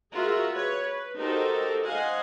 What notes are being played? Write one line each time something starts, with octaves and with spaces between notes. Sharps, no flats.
F4 F#4 G#4 A#4 E5 F#5
B4 C#5
B4
D#4 F#4 G4 A4 A#4 C5
C5 D#5 F5 F#5 G#5